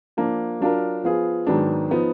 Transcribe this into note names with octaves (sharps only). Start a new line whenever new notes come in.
F3 A#3 D4
F#3 D4 F4 A#4
F3 B3 F4 G#4
G#2 D#3 F#3 B3 D4
F3 B3 D#4